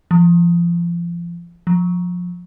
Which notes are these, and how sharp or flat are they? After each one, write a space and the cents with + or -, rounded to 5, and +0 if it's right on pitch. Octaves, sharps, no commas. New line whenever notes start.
F3 -30
F3 +25